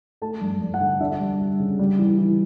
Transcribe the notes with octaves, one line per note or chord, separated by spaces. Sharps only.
A3 A5
G2
G2
F#5
D3
D4 E5
G3
G3
C#3
G3
E3
E3